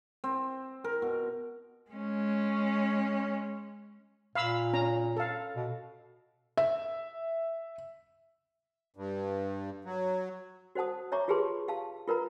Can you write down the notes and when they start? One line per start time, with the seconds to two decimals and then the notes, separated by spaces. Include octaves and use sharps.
0.24 C4
0.84 A#4
1.02 B2
1.91 G#3 C#4
4.35 A#2 F5 B5 E6
4.73 C#4 A#5
5.16 A4 F5
5.56 B2
6.57 E5
8.96 G2
9.85 F#3
10.75 F#4 C5 F#5 A5 D#6
11.12 C#5 E5 A#5 C#6 D6
11.28 F4 G4 G#4 B4 A5 C6
11.68 G4 F5 A5
12.08 F4 A#4 B4 A#5